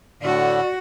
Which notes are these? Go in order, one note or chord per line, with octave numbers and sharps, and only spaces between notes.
A2 D3 F#4 D5